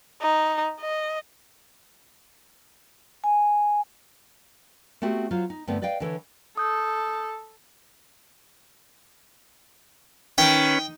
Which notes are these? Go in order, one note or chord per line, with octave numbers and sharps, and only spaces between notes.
D#4
D#5
G#5
A3 B3 C4 F#4 G4
F#3 F4 C5
D#4
G2 D3 A3 B3 C4 B4
B4 D5 D#5 F5 G5
D3 E3 A4 C#5
A4 D#6 G6
D#3 C#4 B4 G5